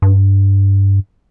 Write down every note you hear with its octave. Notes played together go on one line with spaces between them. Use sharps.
G2